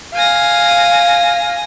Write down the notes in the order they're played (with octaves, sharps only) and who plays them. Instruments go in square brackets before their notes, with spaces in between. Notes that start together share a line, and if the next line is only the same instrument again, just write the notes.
[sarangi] F5 [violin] G#5 A#6